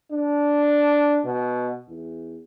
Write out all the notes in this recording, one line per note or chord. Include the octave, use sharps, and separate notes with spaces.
D4
B2
E2